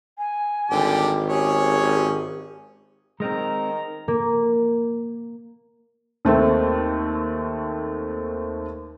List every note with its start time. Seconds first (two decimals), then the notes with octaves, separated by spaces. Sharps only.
0.18 G#5
0.71 G#1 D3 G3 G4
1.29 C#4 G4 G#4 C#5
3.20 D#3 G#3 C4 A#5
4.08 A#3
6.25 D#2 A3 C4